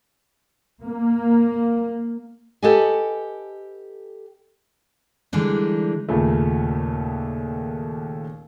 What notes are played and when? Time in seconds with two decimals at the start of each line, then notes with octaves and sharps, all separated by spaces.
0.86 A#3
2.62 G4 A4 B4 D#5 F#5 G#5
5.33 D3 E3 G3 G#3 D4 D#4
6.09 D#2 A#2 C#3 A3